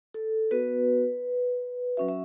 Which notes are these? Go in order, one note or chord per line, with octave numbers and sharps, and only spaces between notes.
A4
B3 F#4 B4
F#3 C#4 F#4 E5
E5